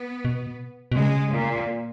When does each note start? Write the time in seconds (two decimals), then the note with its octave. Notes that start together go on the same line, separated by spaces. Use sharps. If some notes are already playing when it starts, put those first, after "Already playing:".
Already playing: B3
0.25 B2
0.92 B2
0.97 C#3 G#3
1.34 A#2